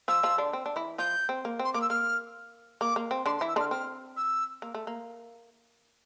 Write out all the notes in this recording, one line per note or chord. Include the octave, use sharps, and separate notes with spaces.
F3 F4 E6
F3 F4
D3 D4
C4
D4
E3 E4
F3 F4 G6
C4
A#3
C4
C6
A#3 D6
E6
A#3 F6
A#3 D6
A#3
C4
D3 D4 C6
C6
E3 E4
E6
D3 D4 F6
C4 F6
E6
A#3
A3
A#3